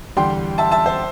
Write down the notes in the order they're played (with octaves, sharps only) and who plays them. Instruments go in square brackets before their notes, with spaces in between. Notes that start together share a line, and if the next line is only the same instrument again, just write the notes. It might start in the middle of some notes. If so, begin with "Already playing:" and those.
[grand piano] E2 D3 G3 G5 C6
E5 A5
E5 A5
C5 E5